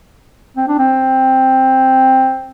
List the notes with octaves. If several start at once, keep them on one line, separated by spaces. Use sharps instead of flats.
C4
D4
C4